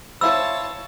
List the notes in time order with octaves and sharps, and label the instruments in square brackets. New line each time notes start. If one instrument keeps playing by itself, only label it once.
[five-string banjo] C4 E4 C5 [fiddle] C#5 A5 [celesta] F5 B5 [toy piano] E6